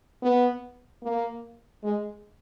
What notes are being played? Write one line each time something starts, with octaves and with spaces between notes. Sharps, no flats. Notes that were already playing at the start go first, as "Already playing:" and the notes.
B3
A#3
G#3